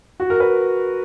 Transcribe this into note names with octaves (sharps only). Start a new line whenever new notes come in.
F#4
A#4
B4